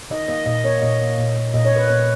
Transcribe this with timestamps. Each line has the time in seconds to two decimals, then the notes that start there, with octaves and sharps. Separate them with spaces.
0.10 D#3 D#5
0.28 A#3 D#5
0.46 A#2 D#5
0.64 A#3 C#5
0.82 A#2 D#5
1.00 A#3
1.18 A#2
1.36 A#3
1.54 A#2 D#5
1.65 C#5
1.72 A#3 B4
1.88 A#2 C#5